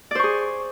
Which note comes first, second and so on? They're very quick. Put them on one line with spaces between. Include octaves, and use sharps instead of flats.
D5 C5 C#6 G#4